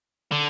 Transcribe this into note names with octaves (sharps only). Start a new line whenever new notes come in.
D3